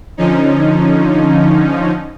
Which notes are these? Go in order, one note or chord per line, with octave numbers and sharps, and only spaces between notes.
D3 F3 C#4 D#4